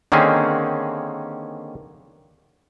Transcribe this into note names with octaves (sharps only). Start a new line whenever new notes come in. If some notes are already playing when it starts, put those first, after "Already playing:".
D3 D#3 A#3 C4 C#4 G#4